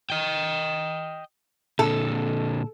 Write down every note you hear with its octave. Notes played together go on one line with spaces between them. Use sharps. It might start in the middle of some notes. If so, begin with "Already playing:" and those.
D#5 G5
A#2 D3 A4